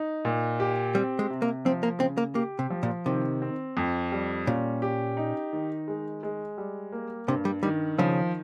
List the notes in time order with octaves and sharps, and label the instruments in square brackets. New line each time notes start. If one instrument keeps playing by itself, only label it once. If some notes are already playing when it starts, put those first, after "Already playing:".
Already playing: [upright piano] D#4
A#2
G4
[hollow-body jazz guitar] G3 [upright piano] C4
[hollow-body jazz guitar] G#3
[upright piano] C3
[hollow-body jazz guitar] A#3
[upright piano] F3 [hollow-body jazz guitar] C4
[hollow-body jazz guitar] A#3
[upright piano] C#3 [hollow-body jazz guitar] C4
[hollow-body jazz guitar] A#3
[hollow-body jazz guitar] A#3 [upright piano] G4
[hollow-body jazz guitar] C3
[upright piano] F3
[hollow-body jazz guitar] A#2
[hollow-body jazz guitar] C3 [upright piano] D#3
[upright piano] C4
F2
G3
[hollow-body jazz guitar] A#2 [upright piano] C#4
[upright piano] G4
D#4
D#3
G#3
G#3
G3
A#3
[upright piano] G2 [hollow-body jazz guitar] C3
[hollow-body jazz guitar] G3
[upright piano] D#3 [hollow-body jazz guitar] G3
[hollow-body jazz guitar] C#3 [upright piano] F3